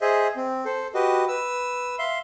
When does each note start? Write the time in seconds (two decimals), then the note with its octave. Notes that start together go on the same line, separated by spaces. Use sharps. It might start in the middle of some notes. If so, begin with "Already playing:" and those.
0.01 G#4 C5 D#5 E5
0.36 C4
0.65 A4 C5
0.94 F#4 G4 B4 D#5
1.28 B4 E6
1.99 E5 F5 C6